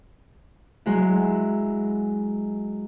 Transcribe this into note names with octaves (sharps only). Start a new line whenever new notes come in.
F#3 G#3 E4